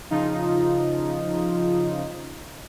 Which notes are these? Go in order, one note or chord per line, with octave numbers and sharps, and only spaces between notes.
C#3 F3 D#4 F4